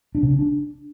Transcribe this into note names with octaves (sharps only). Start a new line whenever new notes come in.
D4
C#3
C#4
D4